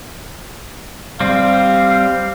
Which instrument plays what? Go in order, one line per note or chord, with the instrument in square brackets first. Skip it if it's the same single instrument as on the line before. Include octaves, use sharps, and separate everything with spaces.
[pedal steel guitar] G3 C4 [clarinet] F5